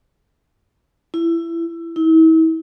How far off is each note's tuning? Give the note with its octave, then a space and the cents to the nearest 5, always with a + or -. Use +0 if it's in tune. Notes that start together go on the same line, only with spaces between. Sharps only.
E4 +20
E4 -40